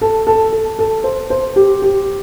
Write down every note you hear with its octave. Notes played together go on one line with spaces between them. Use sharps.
A4
A4
A4
A4
C5
C5
G4
G4